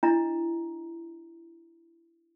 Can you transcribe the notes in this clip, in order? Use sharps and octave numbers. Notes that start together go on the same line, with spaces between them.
D4 E4 D#5 A#5